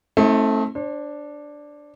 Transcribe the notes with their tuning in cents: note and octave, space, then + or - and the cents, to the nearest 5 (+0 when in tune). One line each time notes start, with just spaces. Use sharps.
A3 +0 C4 +30 D#4 +45
D4 +0 C5 +40